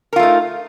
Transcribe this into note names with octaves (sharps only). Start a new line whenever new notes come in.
A3 D#4 F4 A#4